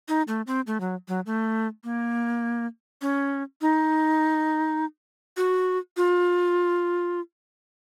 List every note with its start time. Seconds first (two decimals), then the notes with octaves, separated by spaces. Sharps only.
0.08 D#4
0.28 A3
0.47 C4
0.67 A3
0.80 F#3
1.08 F#3
1.26 A3
1.84 A#3
3.02 C#4
3.62 D#4
5.37 F#4
5.97 F4